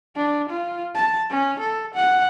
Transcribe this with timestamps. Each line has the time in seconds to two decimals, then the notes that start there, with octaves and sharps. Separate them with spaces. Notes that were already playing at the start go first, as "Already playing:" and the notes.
0.16 D4
0.49 F4
0.95 A5
1.30 C#4
1.59 A4
1.94 F#5